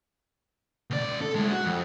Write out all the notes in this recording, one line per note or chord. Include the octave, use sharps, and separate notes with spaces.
C#2 D5
A4
G#3 E4
F#4
F2